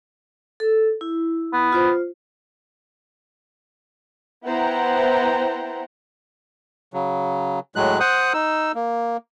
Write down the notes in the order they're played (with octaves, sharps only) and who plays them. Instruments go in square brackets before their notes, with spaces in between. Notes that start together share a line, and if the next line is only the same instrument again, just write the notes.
[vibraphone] A4
E4
[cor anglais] B3
[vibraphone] F4 C5
[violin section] B3 E4 C5 F#5 G5 A#5
[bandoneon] C#3 F#3
A2 F#3 G#3 F#6
C5 F#5 D#6 F#6
D#4 E6
A#3